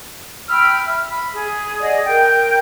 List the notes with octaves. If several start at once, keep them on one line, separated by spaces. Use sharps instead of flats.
G5 B5 E6 F6
E5
B5
G#4
G#4 D5 D#5 F#5
A#4 G5 G6